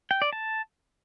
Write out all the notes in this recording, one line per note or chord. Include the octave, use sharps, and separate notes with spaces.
G5
D5
A5